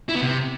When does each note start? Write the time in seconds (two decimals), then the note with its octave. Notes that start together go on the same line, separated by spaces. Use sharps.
0.09 E4
0.15 B3
0.22 C3